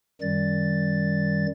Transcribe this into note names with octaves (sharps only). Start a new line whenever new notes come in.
F#2 D#3 G3 A6